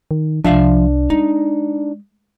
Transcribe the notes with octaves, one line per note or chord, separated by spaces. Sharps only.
D#3
C2 C3 F3 D4 E5 F5
G#3 D#4